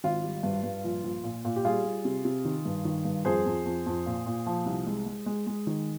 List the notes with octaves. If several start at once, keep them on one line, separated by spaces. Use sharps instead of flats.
G#1 F4
G3
G2
G2
A#1
A#1
A#2
A#2
G4
G3 F4 G#4
G3
C3
C3
D#3
G2
D#3
G2
F2 G#4 C5
F2
F2
F2
A#2
A#2
F3
C2
G#3
G#3
G#3
G#3
D#3